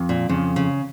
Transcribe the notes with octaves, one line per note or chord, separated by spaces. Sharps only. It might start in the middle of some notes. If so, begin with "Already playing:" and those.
Already playing: F2
A#2
F2 C#3
C#3